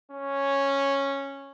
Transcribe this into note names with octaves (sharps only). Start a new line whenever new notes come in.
C#4